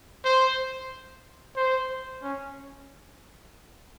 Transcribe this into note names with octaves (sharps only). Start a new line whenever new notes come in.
C5
C5
C#4